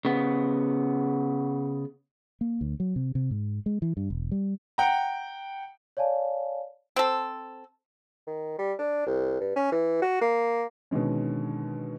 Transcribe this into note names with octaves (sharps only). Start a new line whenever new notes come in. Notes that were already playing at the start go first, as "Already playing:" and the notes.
C#3 B3
A#3
D2
F#3
C3
C3
G#2
G#3
E3
G2
E1
G3
F#5 G5 A#5
C#5 D5 F5 G#5 A5
C4 A4
D#3
G3
D4
C2
G2
C#4
E3
F#4
A#3
B2 D3 D#3 G#3 C#4